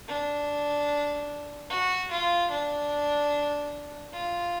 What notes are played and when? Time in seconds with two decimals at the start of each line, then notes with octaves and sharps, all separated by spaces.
0.08 D4
1.70 F#4
2.11 F4
2.51 D4
4.14 F4